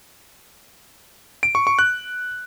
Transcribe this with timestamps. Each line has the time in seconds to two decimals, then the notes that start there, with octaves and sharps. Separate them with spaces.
1.43 D7
1.55 C#6
1.67 C#6
1.79 F#6